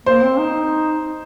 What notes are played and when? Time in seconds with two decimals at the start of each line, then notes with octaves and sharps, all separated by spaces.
0.06 A#3 C5
0.23 C4
0.39 D#4